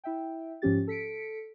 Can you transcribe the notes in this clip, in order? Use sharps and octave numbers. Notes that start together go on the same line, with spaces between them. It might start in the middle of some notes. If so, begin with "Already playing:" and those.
E4 E5 G5
G#2 F3 C#4 G4 A6
A4 B6 C#7 D7